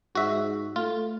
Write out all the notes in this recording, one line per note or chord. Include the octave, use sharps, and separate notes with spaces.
G#2 F#4 E5
A3 F4